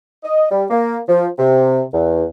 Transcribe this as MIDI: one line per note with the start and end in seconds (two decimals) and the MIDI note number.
0.24 0.46 75
0.52 0.64 55
0.70 0.99 58
1.09 1.27 53
1.39 1.82 48
1.93 2.25 40